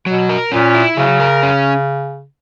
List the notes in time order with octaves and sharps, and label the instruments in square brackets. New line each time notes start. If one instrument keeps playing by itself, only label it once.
[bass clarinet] B2 [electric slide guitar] F#3
[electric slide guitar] A#4
[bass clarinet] A#2 [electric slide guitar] C#4
[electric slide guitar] E4
[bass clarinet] C#3 [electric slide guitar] F#3
[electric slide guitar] A#4
C#4